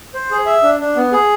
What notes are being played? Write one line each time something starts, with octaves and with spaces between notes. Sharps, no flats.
C5
G#4
E5
D4
D4
B3
G#4